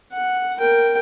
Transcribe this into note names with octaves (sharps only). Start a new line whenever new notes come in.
F#5
A#4 G5